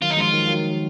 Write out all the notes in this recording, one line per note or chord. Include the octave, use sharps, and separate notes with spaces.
D#3 F#3 F4
D#4
F3 G#3 F4
D#3 F#3
D#3 F#3